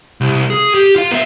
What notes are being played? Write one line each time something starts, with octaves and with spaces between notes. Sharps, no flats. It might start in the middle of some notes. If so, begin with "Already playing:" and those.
C2
G#4
G4
F4 F5
B3 E5